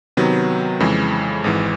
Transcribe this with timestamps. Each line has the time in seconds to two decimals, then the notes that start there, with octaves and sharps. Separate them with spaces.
0.17 C3 D#3 F#3 B3
0.80 F2 C#3 E3 G#3
1.44 G#1 G#2 E3